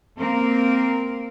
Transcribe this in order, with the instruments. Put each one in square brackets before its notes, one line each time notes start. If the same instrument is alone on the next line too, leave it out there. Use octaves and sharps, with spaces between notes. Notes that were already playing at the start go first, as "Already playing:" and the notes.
[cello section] A#3 C4 A#4